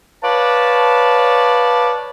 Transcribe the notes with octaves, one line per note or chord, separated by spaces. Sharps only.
B4 C#5 D5 F5 A5